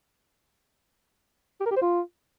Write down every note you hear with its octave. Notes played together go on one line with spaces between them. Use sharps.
G4
A#4
G4
C5
F4